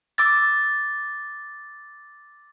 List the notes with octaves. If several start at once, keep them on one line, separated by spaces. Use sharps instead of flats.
D6 E6 A6